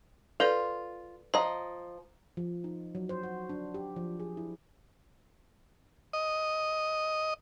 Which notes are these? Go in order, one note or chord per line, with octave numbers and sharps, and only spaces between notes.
F4 A4 B4 D5
F3 D#5 A#5
F3
D#4
F#3
C5
F#4
D4
G4
F3
G#4
E4
D#5